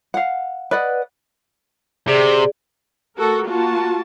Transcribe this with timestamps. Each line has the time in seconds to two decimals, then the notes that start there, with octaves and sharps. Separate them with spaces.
0.14 F5 F#5
0.71 B4 D5 D#5 F#5
2.07 C3 G#4 D5
3.17 A3 F#4 A4 A#4
3.46 A#3 F4 F#4 A5